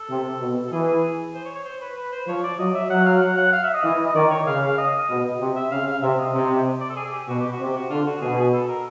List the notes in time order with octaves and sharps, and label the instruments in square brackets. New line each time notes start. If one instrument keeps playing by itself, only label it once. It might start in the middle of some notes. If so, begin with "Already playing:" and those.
Already playing: [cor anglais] A4
[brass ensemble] C3
B2
[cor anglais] A4
[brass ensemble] E3 [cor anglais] G#4
[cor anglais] G#4
C5
C#5
C#5
C5
B4
B4
C5
[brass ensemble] F3 [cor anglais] C#5
[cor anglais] D5
[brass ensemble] F#3 [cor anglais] D#5
[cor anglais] E5
[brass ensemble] F#3 [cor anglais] F#5
[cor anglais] F5
F#5
F#5
F5
E5
D#5
[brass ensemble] E3
[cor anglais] D#5
[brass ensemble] D#3 [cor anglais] D5
[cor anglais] C#5
[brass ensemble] C#3 [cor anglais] F5
[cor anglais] F5
D#5
[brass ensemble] B2
C3
[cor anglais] E5
[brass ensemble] C#3 [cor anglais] F5
[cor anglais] F5
[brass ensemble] C3 [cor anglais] E5
[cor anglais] D#5
[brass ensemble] C3
[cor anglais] D5
A4
G#4
G#4
G4
[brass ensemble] B2 [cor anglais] F#4
[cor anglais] G4
F#4
[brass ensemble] C3
[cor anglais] G4
F#4
[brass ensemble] D3 [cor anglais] F4
[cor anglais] F#4
[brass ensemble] B2 [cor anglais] G#4
[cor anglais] G#4
A4
A#4